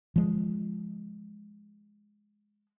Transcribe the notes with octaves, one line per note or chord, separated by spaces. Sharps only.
F3 G#3